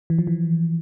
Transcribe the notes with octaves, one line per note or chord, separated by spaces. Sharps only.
E3
F3
E3